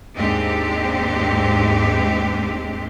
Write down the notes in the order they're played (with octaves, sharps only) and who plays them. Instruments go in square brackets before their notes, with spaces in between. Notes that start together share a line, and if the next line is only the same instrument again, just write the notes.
[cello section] D#2 G#2 C4 D4 G4